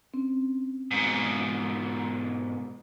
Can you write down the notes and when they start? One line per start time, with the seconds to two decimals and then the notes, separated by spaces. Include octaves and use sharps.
0.14 C4 C#4
0.91 G#2 B2